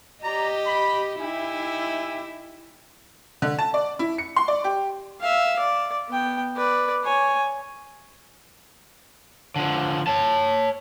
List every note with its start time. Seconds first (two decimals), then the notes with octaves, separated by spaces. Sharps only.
0.23 G4 D5 D#5 A#5
0.66 B5
1.20 D#4 E4 G4 E5 G#5
3.42 D3
3.59 A5
3.74 D5
3.99 E4
4.18 C#7
4.36 C6
4.48 D5
4.64 G4
5.20 E5 F5
5.59 D5
6.09 B3 G5
6.56 B4 D5
7.04 C#5 G#5
9.56 D3 F3
10.07 C#5 A5